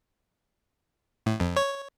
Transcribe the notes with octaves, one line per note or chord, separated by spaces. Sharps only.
A2
F2
C#5